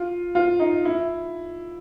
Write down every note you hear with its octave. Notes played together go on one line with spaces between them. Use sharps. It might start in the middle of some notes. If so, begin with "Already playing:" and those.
Already playing: F4
F4
D#4
E4